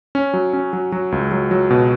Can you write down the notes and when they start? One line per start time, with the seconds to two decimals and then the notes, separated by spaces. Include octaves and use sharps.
0.15 C#4
0.34 F#3
0.53 C#4
0.73 F#3
0.92 F#3
1.12 C#2
1.32 F#3
1.51 F#3
1.70 B2